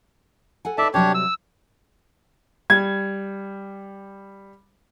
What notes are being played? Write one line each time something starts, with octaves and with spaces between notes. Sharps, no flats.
A4 F#5 G#5
D#4 B4 D5 E5 A5
C3 F#3 G3 D4 G4 C#5
E6
G3 G#6